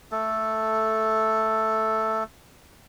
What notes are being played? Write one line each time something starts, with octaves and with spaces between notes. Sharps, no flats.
A3 A4